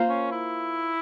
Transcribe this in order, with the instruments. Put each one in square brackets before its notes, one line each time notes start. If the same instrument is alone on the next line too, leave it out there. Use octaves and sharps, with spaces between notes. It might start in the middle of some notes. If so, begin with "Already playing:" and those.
Already playing: [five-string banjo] A#3 F4 C5 F5
[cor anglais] C#4
E4